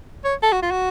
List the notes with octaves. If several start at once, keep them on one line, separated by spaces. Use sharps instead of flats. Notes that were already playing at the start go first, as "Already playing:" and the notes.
C#5
A4
F#4
F4
F#4